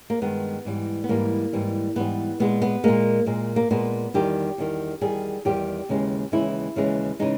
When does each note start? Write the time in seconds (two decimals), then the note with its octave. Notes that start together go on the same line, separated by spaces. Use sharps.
0.10 A#3
0.22 G2 D#3 G#3 B3
0.65 G#2 E3 G3
1.04 B3
1.09 G#2 E3 G3 A#3
1.53 G#2 E3 G3
1.96 G#2 E3 G3 B3
2.40 A#2 G#3 B3
2.62 B3
2.84 A#2 G#3 A#3
3.26 A#2 G#3
3.56 A#3
3.71 A#2 G#3 B3
4.14 E2 D#3 G3 G4
4.58 E2 D#3 G3
5.01 E2 D#3 G3 G#4
5.45 E2 D#3 G3 G4
5.89 D#2 C#3 E3 G#3
6.32 D#2 C#3 E3 G#3 E4
6.76 D#2 C#3 E3 G#3
7.19 C#3 E3 G#3 D#4